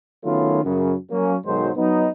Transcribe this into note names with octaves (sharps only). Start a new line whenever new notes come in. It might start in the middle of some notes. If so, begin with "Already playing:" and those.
D#3 F#3 A3 B3 C#4 F4
F#2 C#3
F#3 A#3 C#4
B1 G#2 D#3 F#3 G#3 C5
F#3 B3 D#4